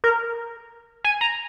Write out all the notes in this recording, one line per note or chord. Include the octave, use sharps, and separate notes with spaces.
A#4
G#5
A#5